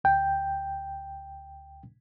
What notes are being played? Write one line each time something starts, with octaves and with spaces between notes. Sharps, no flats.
D2 G5